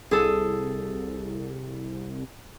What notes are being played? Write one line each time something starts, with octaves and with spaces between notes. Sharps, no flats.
C2 G#4 A4